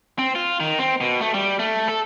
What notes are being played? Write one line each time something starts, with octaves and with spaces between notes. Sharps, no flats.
C4
F4
D#3
C4
B2
A3
G3
A3
A4